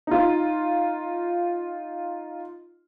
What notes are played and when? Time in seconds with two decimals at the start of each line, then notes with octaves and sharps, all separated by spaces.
0.07 D#4 F4